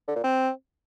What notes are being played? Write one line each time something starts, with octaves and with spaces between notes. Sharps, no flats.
D3
A#2
C4